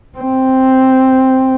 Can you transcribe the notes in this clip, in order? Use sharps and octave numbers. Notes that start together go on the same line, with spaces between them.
C4